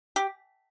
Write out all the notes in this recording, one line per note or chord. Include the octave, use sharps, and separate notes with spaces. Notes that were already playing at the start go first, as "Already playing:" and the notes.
G4